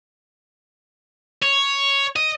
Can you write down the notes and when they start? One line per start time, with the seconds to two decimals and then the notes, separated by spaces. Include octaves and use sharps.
1.42 C#5
2.16 D#5